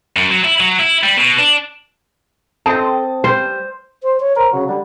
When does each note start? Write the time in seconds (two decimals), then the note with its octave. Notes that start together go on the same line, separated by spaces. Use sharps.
0.16 F#2
0.30 F#3
0.44 E4
0.60 F#3
0.79 E4
1.04 G3
1.17 B2
1.39 D4
2.66 C4 A4 D#5 A5 D#6
3.24 G3 C5
4.03 C5
4.20 C#5
4.37 A#4 C5
4.53 C#3 F#3
4.68 D3 G3